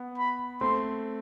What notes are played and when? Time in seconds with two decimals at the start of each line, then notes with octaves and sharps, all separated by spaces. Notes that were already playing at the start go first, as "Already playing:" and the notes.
Already playing: B3
0.18 B5
0.61 A3 C4 C6